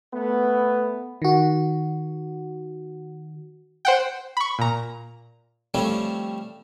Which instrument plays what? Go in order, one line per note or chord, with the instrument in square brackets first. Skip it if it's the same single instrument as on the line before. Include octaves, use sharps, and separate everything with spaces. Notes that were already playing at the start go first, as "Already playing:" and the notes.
[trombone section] A3 B3
[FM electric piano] D#3 F#4
[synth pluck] C5 F#5 G5
B5 C#6
A#2 A#5
[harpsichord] F3 G3 A3 C4 C#4